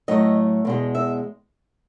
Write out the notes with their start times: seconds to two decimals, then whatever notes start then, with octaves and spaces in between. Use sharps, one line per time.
0.08 A2 F#3 A3 D#5
0.65 E2 B2 G#3
0.95 E5